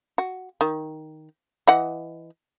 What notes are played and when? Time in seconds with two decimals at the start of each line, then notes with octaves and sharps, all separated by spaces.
0.18 F#4
0.61 D#3
1.67 E3 D#5 F#5